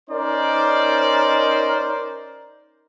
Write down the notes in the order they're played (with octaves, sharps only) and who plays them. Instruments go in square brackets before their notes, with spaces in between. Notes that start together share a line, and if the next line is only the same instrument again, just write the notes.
[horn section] C#4 D#4 A#4 C5 D5